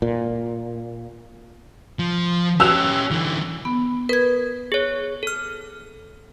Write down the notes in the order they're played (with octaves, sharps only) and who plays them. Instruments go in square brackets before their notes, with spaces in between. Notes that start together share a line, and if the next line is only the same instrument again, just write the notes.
[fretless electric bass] A#2
[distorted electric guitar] F3
[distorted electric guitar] C#4 G4 [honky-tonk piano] E6 F#6 F7
[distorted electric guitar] D3 E3
[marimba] B3
[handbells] A#4 [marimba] B4 G#6
[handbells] G#4 C#5
A4 F6